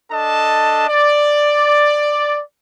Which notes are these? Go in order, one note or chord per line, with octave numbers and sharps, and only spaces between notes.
D4 A4 D#5 A5
D5